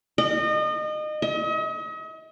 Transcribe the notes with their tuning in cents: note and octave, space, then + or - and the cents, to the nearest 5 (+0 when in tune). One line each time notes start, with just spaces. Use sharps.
D#5 -30
D#5 +40